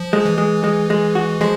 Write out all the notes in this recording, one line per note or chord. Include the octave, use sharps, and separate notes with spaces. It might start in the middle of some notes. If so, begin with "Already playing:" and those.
Already playing: F3
G#3
E3
G#3
G#3
G#3
F#4
F3 G#3